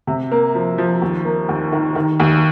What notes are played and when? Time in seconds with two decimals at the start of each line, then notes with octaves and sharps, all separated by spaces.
0.07 C3
0.31 A#3
0.55 F3
0.78 F3
1.02 D#2
1.25 A#3
1.49 D#2
1.72 D#3
1.95 D#3
2.20 D#2